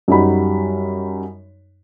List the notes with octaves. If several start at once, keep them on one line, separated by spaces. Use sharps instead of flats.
F#2 G3 D#4 F#4 B5